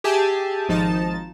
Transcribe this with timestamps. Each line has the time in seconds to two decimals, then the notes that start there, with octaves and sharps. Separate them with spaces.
0.04 G4 G#4 E5 G#5 A5
0.69 G#1 F3 D#4 A5 A6